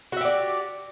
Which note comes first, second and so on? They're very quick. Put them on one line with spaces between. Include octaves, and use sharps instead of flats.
F#4 E5 G4 D5